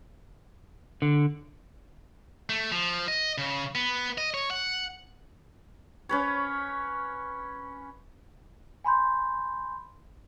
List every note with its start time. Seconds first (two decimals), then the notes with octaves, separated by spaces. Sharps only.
1.02 D3
2.49 A3
2.72 F3
3.08 D#5
3.38 C#3
3.75 B3
4.18 D#5
4.34 C#5
4.51 F#5
6.09 C#4 B4 C#5
8.84 G#5 B5 C6 G6